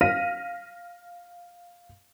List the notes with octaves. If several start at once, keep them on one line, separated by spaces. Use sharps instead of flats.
F5 F6 A#6 B6 D#7